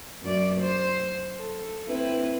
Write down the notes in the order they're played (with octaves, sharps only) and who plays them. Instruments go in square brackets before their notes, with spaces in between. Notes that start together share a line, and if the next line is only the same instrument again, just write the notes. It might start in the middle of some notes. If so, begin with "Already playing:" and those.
[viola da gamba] F#2 D5
C5
A4
C4 E4 B4